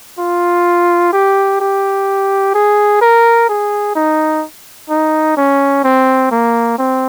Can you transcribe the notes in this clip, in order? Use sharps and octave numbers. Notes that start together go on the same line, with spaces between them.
F4
G4
G4
G#4
A#4
G#4
D#4
D#4
C#4
C4
A#3
C4